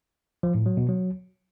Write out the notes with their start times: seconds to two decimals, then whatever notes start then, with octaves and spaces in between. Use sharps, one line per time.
0.43 F3
0.55 A2
0.66 F#3
0.77 B2
0.88 F#3